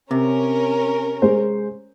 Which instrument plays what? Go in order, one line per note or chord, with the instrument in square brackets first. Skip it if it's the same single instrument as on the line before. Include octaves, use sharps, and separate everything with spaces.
[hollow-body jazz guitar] C3 [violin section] C#4 A#4
[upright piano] G#3 C5